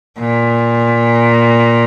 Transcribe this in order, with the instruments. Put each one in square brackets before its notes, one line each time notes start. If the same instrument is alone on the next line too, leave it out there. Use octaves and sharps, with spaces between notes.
[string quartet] A#2